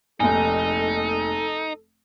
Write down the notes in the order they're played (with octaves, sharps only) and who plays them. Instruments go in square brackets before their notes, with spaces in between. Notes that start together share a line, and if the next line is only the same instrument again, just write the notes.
[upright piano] F1 A#1 [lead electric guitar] D#4 [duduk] A4 [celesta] G#5